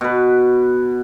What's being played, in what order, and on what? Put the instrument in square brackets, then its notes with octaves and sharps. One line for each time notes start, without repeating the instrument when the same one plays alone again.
[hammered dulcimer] B2 B4